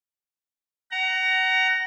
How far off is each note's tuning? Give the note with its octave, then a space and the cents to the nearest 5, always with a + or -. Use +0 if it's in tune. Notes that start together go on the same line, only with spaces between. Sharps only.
F#5 +30 A#5 +0